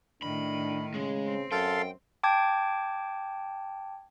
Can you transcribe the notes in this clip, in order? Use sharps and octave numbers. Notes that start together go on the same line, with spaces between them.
A2 D#3 D4 B5
C#3 G#3
C4
F#2 A4 F5 G5 C6
G5 A5 D6 G#6